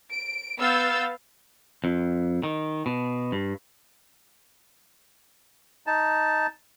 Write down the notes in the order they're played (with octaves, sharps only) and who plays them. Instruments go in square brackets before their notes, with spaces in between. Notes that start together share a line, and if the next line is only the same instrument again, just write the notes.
[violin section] D7
B3 F5 E6 G6 A6
[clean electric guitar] F2
D#3
B2
G2
[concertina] D#4 A5